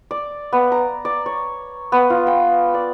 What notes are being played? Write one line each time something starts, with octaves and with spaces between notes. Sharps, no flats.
D5
B3
A#5
D5
C#5
B3
F4
G5
D5